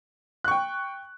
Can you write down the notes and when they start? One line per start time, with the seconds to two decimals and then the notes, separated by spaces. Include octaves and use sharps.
0.44 F#6
0.48 C#6
0.51 G5